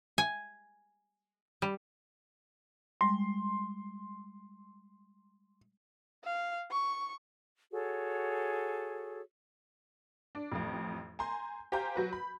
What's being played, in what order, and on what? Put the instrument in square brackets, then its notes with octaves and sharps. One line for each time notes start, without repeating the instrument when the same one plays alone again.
[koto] G#5
G3
[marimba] G3 G#3 [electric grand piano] C6
[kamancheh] F5
C#6
[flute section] F#4 G#4 A4 C#5
[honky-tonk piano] D4
A1 F2
G#5 A#5 C6 G6
G4 C5 F5 G#5 A#5 G6
F#3 F#4 B4
B5